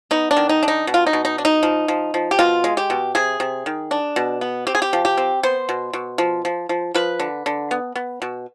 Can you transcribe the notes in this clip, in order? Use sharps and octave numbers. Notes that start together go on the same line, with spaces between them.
B3 D#4
D4
D#3
D#4
D4
D#4
B2
F4
D#4
B2
D#4
D4
D#4
F3
F3
F3
G4
B2 F4
G#3
G4
B2
C3 G#4
C3
D#3
D4
B2
B3
C4 G4
G#4
G4
F3
G4
C4
B3 C5
B2
B2
F3
F3
F3
F3 B4
D3
D3
B3
B3
B2